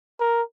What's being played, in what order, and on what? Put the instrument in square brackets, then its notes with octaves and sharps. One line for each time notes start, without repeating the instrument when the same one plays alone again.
[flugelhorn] A#4